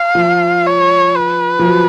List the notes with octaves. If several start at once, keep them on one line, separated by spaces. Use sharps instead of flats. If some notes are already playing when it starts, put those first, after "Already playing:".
Already playing: F5
F3
C#5
B4
F3
F#3